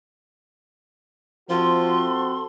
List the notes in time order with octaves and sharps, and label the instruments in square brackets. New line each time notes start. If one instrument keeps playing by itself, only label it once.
[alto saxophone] F3 [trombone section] C4 F#4 A4 [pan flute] C6